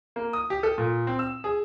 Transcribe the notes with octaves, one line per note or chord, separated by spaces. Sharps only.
A#3
D#6
G4
A4
A#2
C4
E6
G#4